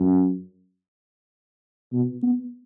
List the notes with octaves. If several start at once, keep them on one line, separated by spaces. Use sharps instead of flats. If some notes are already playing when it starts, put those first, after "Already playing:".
Already playing: F#2
B2
B3